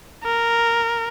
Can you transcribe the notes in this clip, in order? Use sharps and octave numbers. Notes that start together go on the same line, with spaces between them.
A#4